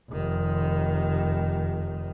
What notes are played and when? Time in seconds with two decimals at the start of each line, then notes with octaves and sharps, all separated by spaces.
0.11 F1 D#3